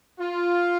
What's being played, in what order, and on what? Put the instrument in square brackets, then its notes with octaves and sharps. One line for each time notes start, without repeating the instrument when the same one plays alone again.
[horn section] F4